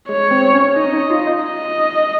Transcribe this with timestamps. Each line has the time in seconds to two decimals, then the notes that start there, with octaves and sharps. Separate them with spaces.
0.09 G#3 C#5
0.31 C4
0.54 C#4
0.76 D#4 D#5
0.93 D#4
1.10 F4
1.27 D#4
1.44 D#5